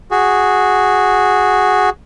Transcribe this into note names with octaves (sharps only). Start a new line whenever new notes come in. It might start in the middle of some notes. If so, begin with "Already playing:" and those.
F#4 G#4